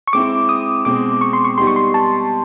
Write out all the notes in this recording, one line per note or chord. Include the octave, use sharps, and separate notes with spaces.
C#6
G#3 C4 E4 D6
D#6
B2 G#3 C4 D6
C#6
C6
C#6
G3 B3 D#4 G4 C6
C#6
C6
A5